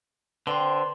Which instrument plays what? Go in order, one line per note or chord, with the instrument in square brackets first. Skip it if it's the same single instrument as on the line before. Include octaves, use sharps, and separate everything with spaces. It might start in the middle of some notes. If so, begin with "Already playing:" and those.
[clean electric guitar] D3 [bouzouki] C4 C5 [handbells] B4 D5 C6